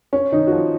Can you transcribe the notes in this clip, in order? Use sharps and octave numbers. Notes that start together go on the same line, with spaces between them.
C#4
D#3 D#4
F#4
F3 F4